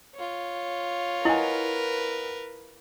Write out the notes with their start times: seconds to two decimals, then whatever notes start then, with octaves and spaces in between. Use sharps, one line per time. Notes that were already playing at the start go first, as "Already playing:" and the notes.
0.15 F4 C#5
1.25 E4 A#4 B4 D#5 F#5 G#5